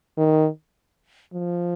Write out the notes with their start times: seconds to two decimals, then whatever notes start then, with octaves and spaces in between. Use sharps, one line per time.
0.17 D#3
1.34 F3